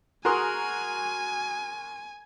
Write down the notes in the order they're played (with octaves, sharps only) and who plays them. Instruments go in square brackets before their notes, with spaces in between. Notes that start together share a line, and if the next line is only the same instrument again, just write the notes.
[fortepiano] F#4 G#4 A#4 [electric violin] G#5 [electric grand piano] A#5 C6 D#6